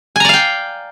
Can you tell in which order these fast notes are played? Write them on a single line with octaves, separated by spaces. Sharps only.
G#5 A#5 D5 F5 G5